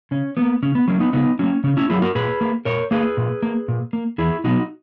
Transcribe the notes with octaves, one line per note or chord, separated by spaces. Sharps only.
C#3 C#4
F#3 B3
A#3
C#3 C#4
B3
F#3 A#3 C#4
B3 D#4
C#3 B3 D#4
F#3 A#3 C#4
C#3 C#4
C#4 E4
F#3 A#3 E4 G#4
F#4 A#4
A#2 G#4 B4
A#3
A#2 A#4 C#5
A#3 G#4 B4
A#2
A#3
A#2
A#3
E2 E4 G#4
B2 F#3 B3 D#4 F#4